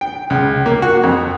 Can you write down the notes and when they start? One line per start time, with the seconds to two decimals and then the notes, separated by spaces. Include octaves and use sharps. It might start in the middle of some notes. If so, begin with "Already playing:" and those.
0.01 G5
0.30 C#2
0.66 A#3
0.82 F#4
1.03 F2